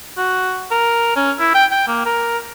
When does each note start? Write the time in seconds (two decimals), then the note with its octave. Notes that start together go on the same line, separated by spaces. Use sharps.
0.18 F#4
0.71 A#4
1.16 C#4
1.39 E4
1.55 G5
1.71 G5
1.88 A#3
2.06 A#4